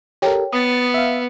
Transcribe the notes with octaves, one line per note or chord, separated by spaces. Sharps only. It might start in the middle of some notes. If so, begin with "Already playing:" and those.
G4 A4 A#4 C#5 G5
B3 D#6 A6
E5 F5